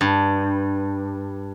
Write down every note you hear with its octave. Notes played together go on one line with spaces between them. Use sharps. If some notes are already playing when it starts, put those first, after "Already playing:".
G2